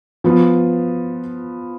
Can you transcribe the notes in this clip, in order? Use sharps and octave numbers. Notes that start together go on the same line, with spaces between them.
F3 B3 F4